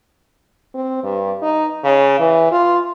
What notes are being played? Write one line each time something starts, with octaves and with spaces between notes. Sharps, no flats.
C4
G2
D#4
C#3
E3
F4